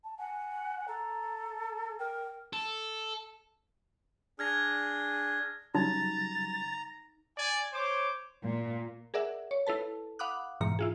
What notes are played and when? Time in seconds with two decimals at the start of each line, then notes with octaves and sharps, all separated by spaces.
0.04 A5
0.18 F#5 G#5
0.88 A4 A#5
1.99 A#4 G5
2.53 A4
4.39 D4 G#4 F6 G#6 A#6
5.75 C#3 F#3 G3 D#4 A#5 A6
7.37 D5 G#5
7.73 C5 C#5 D6
8.44 A#2
9.14 G#4 A#4 D5 E5 F#5
9.51 C#5
9.67 E4 A4 B4 A5
10.19 F5 F#5 B5 D6 D#6 F#6
10.61 G#2 B2 E3 A#5 C#7
10.79 E4 F4 G#4